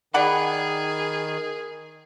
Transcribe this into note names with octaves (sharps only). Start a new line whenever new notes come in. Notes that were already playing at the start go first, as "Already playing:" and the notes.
D#3 G#4 D5 F#5 B5